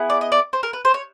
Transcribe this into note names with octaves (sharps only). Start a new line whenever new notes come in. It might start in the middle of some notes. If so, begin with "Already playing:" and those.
Already playing: B3 E4 G#4
D5
D#5
D5
C5
A#4
B4
C5
C#5